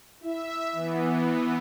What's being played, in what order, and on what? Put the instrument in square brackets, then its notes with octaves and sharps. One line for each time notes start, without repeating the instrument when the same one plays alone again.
[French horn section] E4 [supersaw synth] E5
[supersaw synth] E3 B3